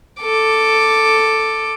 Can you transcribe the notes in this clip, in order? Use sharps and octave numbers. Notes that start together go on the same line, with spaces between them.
A4 D6